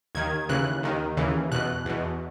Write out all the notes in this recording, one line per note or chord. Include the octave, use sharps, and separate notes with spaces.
D#2 D#3 G#6
D#2 C#3 E3 F#6
D#2 D#3
D#2 C#3 E3
E2 B2 F#6
E2 B2